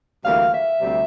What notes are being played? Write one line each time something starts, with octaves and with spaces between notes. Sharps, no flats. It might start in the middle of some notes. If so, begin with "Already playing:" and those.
D2 C3 E3 G3 A#3 F5
E5
D2 C3 G3 C4